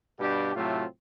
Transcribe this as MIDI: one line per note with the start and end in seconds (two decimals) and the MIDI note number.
0.19 0.52 43
0.19 0.52 47
0.19 0.52 62
0.19 0.52 67
0.55 0.84 45
0.55 0.84 48
0.55 0.84 54
0.55 0.84 57
0.55 0.84 60
0.55 0.84 65